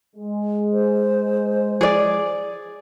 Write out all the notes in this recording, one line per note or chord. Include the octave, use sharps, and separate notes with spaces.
G#3
C5
G#4 D5